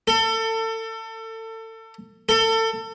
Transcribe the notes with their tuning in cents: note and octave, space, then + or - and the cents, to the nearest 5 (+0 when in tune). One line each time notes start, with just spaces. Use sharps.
A4 +30
A4 +30